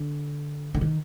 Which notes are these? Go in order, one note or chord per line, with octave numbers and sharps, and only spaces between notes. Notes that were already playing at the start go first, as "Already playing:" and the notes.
Already playing: D3
D3
D#3